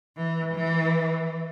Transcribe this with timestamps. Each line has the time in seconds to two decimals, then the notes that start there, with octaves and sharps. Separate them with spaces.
0.17 E3
0.54 E3